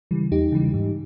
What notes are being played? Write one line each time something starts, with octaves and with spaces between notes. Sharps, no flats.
C#3 E3 G3
E2 D#4 G4
C#3 E3 G3
G#2